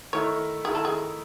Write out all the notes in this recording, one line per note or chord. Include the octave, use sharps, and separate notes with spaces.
D#3 A3 E4 C#5
D#3 A3 E4 G#4
A4
G#4